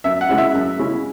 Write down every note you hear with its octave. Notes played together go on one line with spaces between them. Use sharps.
F#2 E5
F#5
C#3 G#3 C#4 E4
E5
F#2
C#3 G#3 C#4 E4